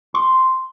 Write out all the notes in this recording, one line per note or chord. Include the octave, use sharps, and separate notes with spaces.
C6